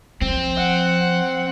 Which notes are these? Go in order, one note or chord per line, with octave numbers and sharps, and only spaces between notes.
F3 C4
F#5